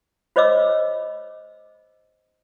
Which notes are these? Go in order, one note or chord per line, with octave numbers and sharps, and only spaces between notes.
F4 C5 C#5 D#5 D6 E6